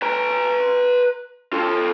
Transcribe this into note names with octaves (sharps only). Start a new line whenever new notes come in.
B4 A#5
F4 A4